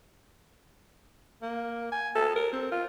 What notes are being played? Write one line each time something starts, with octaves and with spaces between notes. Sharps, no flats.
A#3
G#5
A4
A#4
C4
F4